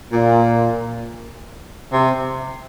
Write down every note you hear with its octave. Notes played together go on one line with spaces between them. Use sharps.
A#2
C3